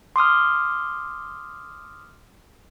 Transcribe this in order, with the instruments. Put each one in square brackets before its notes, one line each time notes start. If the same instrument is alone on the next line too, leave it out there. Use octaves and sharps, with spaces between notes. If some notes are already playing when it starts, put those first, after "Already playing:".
[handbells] C6 D6 D#6 F6